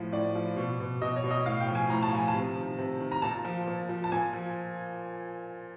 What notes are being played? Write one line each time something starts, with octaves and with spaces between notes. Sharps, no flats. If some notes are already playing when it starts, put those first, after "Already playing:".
Already playing: A2 F3
A2 D5
F3
B2
B2
B2 D#5
C#5
B2
D#5
A2 F5
G5
F3
G#5
A2 A#5
A5
F3 G#5
A5
C3
D#3
C3
D#3
A#5
A#2 A5
F3
A#2
F3
A5
A#2 G#5
F3